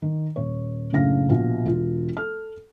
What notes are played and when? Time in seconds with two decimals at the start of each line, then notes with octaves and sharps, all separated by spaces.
0.02 D#3
0.36 D#1 C#5
0.93 F#1 A2 C#3 D4 F5 A#6
1.29 A#1 B2 F4 F#4 F5
1.66 E1 F4
2.17 A4 F6